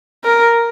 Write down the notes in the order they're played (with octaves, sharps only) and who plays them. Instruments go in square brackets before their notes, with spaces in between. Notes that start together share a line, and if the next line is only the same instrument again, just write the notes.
[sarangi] A#4